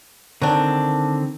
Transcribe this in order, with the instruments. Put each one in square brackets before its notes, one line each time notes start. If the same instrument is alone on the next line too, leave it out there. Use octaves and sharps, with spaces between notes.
[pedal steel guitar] D3 D#3 C4 [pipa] F#3 D4